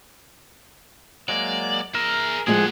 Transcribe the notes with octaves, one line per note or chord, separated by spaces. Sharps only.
F#3 G#3 A#3 D5
G#4 A#4 E5
A2 F3 G#3 A#3 G#4 F#5